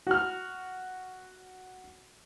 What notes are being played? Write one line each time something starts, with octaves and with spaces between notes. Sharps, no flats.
F#4 F6